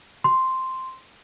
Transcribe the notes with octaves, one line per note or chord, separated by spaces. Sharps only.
C6